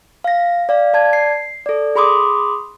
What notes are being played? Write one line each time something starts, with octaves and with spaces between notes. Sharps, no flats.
F5 A#6
D5 F5
D5 A5 G#6
C7
A4 D5
G#4 B5 C6 D6 D#6